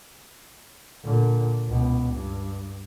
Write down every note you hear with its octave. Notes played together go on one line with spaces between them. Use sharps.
A#2 D3
C#2 B2
G2